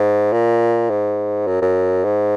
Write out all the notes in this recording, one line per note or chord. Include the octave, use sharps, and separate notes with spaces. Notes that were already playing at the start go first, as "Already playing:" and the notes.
Already playing: G#2
A#2
G#2
F#2
F#2
G#2